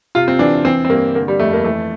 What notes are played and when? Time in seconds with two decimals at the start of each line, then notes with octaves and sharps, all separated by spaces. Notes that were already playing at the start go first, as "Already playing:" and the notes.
0.15 C3 F4
0.28 C4
0.39 E3 D4
0.65 E3 C4
0.85 C4
0.89 G2 A#3
1.15 D3 A#3
1.28 G3
1.39 F2 A3
1.53 A#3
1.64 E3 A3